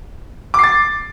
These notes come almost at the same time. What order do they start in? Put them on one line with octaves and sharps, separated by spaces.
D6 C7 A6